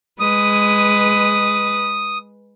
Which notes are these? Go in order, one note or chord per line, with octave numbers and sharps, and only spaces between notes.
G#3 B4 D#6